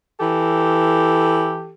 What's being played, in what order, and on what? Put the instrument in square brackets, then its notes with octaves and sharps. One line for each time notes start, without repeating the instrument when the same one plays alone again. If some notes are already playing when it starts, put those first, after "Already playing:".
[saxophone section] E3 G4 A4